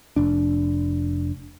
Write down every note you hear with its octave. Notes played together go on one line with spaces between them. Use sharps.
F1 D4